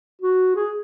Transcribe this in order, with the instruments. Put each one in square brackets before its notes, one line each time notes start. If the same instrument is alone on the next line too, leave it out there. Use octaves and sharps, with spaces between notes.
[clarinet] F#4
G#4